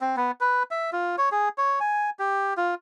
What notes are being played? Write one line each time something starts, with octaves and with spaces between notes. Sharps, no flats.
C4
B3
B4
E5
F4
C#5
G#4
C#5
G#5
G4
F4